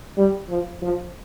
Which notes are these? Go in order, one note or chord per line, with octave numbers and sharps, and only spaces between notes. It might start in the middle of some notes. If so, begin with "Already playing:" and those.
G3
F3
F3